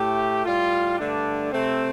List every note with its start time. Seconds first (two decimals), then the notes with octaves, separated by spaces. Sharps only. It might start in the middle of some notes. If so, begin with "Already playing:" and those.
Already playing: A2 A3 G4
0.45 A2 G3 F4
0.98 G2 D3 A3 D4
1.52 C3 A3 C4